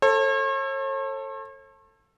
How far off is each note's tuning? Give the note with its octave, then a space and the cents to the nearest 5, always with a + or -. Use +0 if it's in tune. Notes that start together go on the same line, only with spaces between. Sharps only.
A4 +15 C#5 -45